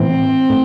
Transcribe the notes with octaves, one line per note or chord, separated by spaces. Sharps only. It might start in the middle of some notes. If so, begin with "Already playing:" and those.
Already playing: A2 E3 B3 C4 E4
A2